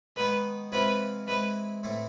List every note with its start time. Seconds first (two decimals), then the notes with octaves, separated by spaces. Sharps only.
0.16 D#3 G#3 B3 B4
0.72 C3 E3 G#3 C4 F4 B4
1.28 E3 G#3 C4 B4
1.83 A2 E3 A3 C4